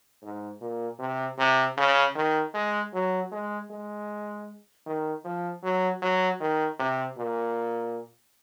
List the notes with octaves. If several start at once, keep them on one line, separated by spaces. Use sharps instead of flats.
G#2
A#2
C3
C3
C#3
D#3
G#3
F#3
G#3
G#3
D#3
F3
F#3
F#3
D#3
C3
A#2